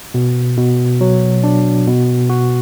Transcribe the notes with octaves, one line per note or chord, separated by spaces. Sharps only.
B2
B2
F#3
D4
B2
F#4